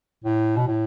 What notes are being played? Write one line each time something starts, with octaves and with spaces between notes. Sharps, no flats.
A2
B2
A2